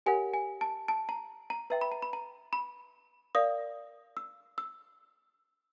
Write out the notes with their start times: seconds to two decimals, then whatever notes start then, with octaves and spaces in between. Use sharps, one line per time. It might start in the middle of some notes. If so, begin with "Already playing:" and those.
0.06 G4 A#4 C#5 F#5 G#5
0.34 G#5
0.61 A5
0.88 A5
1.09 A#5
1.50 A#5
1.70 B4 E5 G5 A#5
1.81 B5
1.92 A#5
2.02 B5
2.13 A#5
2.53 B5
3.35 A#4 D5 F5 D#6
4.17 E6
4.58 E6